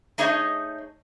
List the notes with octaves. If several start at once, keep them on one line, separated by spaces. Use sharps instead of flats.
A3 D#4 G#4 C#5 D#5